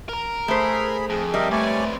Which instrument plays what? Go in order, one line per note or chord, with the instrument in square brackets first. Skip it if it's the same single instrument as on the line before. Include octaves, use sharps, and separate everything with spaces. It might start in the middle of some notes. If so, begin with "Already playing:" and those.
[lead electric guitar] A#4 A#5
[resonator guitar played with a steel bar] A3 C5 [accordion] G#4 B5
[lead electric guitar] F2 [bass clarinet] G#4
[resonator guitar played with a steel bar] G3 [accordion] A#4 D#5 E5
[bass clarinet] A3 [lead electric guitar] C4 B4 [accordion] C#5 D5 G#5